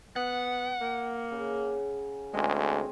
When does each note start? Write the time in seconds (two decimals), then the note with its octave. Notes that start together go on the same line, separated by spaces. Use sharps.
0.16 B3 F#5
0.81 A#3
1.31 C#3
2.34 D2 G#3 C4 C#4 G#4